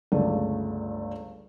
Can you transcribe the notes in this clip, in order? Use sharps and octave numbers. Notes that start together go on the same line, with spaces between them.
G1 C#2 A3 D5